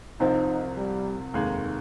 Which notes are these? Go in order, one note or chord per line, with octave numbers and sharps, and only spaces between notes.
C2 C3 F3 C4 D#4
G3
F1 D#2 D#3 G#3